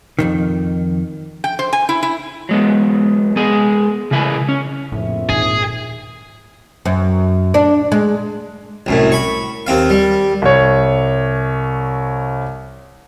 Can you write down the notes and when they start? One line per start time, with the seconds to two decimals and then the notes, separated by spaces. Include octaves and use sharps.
0.19 F2 G#2 D#3
1.44 G5
1.59 C5
1.73 G#5
1.89 E4
2.03 E4
2.49 F#3 G#3 B3
3.36 G#3 B3 G#4
4.11 C#3 E3 E4 G#4
4.49 C#4
4.92 A#1 F2 A2 C4 E5
5.29 D#1 G#2 D#3 G#4
6.85 F#2
7.54 D4
7.92 G#3
8.86 C2 F#2 A2
9.12 B5 C#6
9.67 D#2 C4 F5
9.90 G3
10.42 C2 C#5